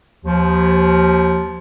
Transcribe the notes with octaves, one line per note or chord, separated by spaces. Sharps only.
D#2 F3